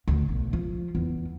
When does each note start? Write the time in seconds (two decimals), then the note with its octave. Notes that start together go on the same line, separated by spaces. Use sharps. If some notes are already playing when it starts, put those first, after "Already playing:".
0.08 D2
0.29 B1
0.53 F3
0.95 E2